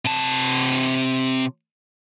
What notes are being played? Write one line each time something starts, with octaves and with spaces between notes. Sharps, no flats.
C3 A5